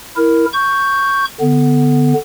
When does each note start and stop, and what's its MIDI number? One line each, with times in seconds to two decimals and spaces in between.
0.17 0.46 64
0.17 0.46 70
0.53 1.25 85
0.53 1.25 91
1.41 2.14 50
1.41 2.14 59